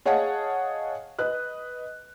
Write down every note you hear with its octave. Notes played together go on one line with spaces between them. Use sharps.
G#4 C#5 D#5 F5 F#5 A5
B4 D#5 F#6